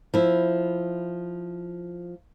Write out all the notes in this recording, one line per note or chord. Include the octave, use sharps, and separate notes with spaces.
F3 E4